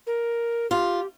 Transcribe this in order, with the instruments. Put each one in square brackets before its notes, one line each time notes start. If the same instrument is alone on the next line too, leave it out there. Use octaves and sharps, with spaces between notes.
[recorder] A#4
[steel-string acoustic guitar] F4 [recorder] G4